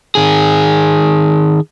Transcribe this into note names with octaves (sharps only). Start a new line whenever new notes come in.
D#3 G#4